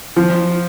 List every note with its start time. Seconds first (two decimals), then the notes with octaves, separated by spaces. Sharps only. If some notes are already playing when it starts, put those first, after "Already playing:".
0.16 F3